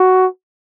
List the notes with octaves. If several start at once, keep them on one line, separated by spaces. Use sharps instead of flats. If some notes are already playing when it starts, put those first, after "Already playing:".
Already playing: F#4